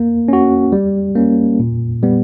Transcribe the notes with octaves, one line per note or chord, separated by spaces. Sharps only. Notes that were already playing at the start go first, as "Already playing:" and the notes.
Already playing: A#3
C#4 F#4
G3
A#3 C#4
A#2
G3 B3